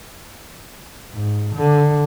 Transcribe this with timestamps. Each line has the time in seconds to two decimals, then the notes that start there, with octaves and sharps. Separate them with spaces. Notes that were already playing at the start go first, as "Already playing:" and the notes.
1.12 G#2
1.56 D3